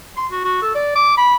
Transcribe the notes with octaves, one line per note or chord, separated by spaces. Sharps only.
C6
F#4
F#4
A4
D5
D6
B5